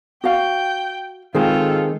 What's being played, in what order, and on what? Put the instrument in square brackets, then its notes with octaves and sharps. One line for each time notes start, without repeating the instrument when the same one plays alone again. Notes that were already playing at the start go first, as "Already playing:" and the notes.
[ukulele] F#4 F5 [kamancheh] G5
[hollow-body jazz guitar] D#3 G#3 C4 [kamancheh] F4 A4 [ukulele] G#4 G#5